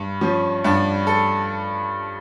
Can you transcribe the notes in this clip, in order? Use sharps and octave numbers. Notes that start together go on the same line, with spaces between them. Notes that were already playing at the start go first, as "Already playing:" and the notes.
Already playing: G2
F3 C#4
G2 D4
A4